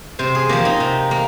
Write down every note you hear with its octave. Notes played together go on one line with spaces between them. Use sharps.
C3 C5
G#4
F3 A#3 G4
D#4
C3
A#3